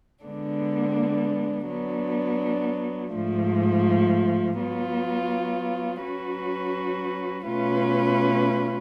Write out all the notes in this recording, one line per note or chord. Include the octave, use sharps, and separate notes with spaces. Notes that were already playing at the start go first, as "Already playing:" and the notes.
D3 G#3 B3 D4
F#3 B3 D4
G#2 F3 A3
F#3 B3 F4
F#3 C#4 F#4 B4
B2 A3 C#4 F4 B4